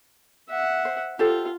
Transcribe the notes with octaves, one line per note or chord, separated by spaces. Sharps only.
E5 F#5
C5
F4 G4 A4 C5